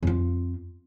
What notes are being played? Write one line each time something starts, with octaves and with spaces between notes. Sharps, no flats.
F2 F4